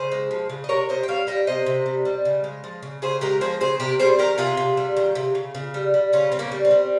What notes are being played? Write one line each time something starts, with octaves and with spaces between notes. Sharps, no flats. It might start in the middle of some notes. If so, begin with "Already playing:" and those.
Already playing: C#3 G#4 C5
G#3
F3
C#3
D#5
C3 A#4 C#5
C3 C5 D#5
G5
G3 C#5 F5
G3 D#5 G5
C3 C5 D#5
C3
G3
G3
C#3
G#3
F3
C#3
C#3 G#4 C5
G#3 G4 A#4
F3 G#4 C5
C#3 G#4 C5
C3 G4 A#4
G3 G#4 C5
D#3 G4 A#4
C3 F4 G#4
C3
G3
D#3
C3
C#3
C#3
G3
G3
C#3 C#4 F4
C#3 C4
A#3 C#4
G3
C4
G3